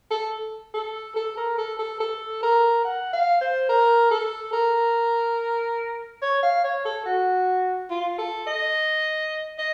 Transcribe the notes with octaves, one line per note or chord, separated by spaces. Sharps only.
A4
A4
A4
A#4
A4
A4
A4
A#4
F#5
F5
C5
A#4
A4
A#4
C#5
F5
C#5
A4
F#4
F4
A4
D#5
D#5